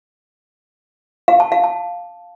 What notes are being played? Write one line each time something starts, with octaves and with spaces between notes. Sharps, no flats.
F5
A5
F5
A5